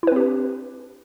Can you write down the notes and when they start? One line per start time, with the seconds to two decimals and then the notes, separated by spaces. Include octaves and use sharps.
0.03 E4
0.07 B4
0.12 C4
0.16 G4
0.20 D4